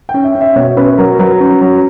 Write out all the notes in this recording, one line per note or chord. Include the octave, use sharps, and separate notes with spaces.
G5
C#4
E5
C#4
E5
B2 C#5
C#4 B4
F#3 A#4
F#3 B4
C#4
F#3